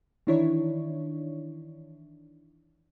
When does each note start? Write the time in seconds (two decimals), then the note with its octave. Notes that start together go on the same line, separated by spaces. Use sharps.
0.27 D#3 E3 D4 E4 C#5